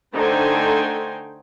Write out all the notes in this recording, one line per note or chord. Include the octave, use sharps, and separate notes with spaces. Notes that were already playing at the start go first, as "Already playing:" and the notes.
D3 A3 D#4 C5 G5 G#5